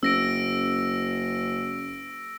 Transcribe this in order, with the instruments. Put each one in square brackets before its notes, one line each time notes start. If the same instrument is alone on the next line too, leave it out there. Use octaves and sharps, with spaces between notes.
[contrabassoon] F#1 [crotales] E6 A#6 D7